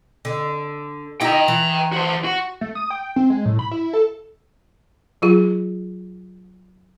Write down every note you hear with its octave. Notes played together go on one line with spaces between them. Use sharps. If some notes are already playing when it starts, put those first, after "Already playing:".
D3
D#4 E4 G4 G5 A#5
E3
F#4 C5
F#4
A3
D#6
G5
C4
G#3
A2
B5
E4
A4
F#3 F4 G#4